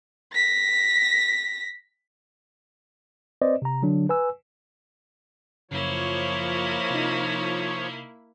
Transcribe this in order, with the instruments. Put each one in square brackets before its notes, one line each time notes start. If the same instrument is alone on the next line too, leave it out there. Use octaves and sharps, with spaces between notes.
[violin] A#6 B6
[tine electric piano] C4 B4 C5 D5 D#5
C3 A#5
D3 F#3 D4
B4 G#5 E6
[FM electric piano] F#2 C#3 [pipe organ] F3 C#5 [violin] A#3 E4
[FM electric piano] C3 D#4